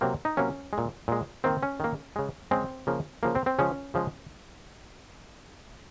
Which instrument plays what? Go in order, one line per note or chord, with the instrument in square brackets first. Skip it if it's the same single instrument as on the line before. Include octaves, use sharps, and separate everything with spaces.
[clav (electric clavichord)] C3 F#3 A#3 C4
D#4
C3 F#3 A#3 C#4
G#3
A#2
A#2 G#3
D#3 A#3 C4
C#4
D#3 A#3
C#3 G#3
C#3 G#3 C4
C#3 F3 A#3
C#3 F3 A#3
C4
C4
C#3 F3 G#3 C#4
C#3 F3 G#3